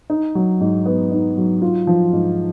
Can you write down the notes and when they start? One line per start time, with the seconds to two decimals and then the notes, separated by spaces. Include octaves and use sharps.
0.10 D#4
0.35 F#3
0.61 G#2
0.86 B3
1.11 D#4
1.37 F#3
1.62 F4
1.87 F3
2.13 G#2